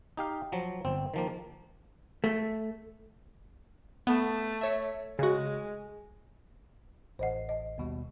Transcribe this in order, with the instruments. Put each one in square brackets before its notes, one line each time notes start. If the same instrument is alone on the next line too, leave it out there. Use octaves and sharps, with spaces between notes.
[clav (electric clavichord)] D#4 G4 F5
F3 F#3
G1 C4
D#3 F3 A#3
[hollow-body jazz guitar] A3
[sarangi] A3 [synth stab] B3
[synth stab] C#5 E5
[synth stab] C#3 F#4 [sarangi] G#3
[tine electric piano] A1 C7 [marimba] C5 D#5 F#5
[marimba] D#5
[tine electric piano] D#2 B2 G3